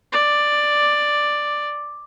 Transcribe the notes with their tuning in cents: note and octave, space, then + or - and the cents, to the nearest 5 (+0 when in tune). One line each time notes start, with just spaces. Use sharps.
D5 +5